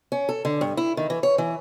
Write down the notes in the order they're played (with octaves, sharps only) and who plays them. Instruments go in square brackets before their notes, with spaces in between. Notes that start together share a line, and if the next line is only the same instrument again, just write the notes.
[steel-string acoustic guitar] C#4
A4
D3
G2
E4
D#3
E3
C#5
E3